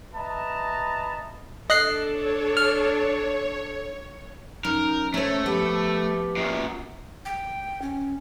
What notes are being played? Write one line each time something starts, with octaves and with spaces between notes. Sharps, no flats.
B4 D#5 E5 A5 A#5
D4 A4 D#5 F#6 C7
C#5
F6
F#2 D#4 A#4
A3 C#4 C5 C#5
F3 B3 G4
F#2 A#2
G5
C#4